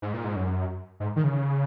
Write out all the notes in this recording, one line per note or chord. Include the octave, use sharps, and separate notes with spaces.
G#2
A#2
G#2
F#2
G#2
D#3
C#3